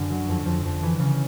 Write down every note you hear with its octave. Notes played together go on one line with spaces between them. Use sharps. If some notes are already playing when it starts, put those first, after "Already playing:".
Already playing: F#2 D3
F#3
F2
F2
F2
E3
C#3